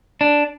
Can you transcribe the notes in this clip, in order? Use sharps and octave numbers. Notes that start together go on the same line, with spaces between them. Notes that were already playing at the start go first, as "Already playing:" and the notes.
D4